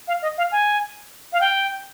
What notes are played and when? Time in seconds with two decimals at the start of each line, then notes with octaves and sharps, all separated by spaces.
0.08 F5
0.22 D#5
0.38 F5
0.52 G#5
1.33 F5
1.41 G5